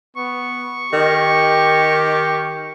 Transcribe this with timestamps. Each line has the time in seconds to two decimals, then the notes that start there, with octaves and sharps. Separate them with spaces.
0.17 B3 C#6
0.93 D#3 G4